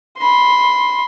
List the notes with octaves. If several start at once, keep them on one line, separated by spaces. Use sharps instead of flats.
B5 C6